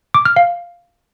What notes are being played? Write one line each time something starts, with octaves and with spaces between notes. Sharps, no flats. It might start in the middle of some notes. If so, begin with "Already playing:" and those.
D6
F6
F5